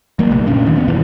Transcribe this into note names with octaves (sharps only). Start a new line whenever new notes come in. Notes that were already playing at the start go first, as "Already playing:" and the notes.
F#3 A#3
A#1 C3 A3
F#2 A#2 C#4 D4
D#2 D#3
E1 B3
F#2 B2 D#3 E3